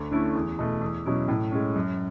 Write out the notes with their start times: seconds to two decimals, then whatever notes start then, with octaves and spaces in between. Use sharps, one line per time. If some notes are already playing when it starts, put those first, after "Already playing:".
Already playing: D2
0.11 D3 A3 C#4 E4
0.35 E2
0.59 B2 A3
0.81 E2
1.06 B2 F#3 C#4 E4
1.28 A2
1.52 G#3 C#4
1.76 F#2